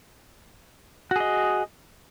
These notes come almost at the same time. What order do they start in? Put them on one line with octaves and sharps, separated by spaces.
F#4 G#4 D#5